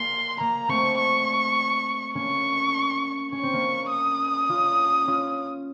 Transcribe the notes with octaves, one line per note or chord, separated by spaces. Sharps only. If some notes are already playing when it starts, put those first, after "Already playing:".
Already playing: A#3 C6
A#3 A#5
A3 C4 C#6
C#6
A#3 C#4 C#6
C#4 C#6
C4
A#3 C#4
D#6
C#4 F4
C#4 F4